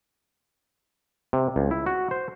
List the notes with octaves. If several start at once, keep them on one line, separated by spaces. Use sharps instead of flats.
C3
C#2
E4
F#4
C5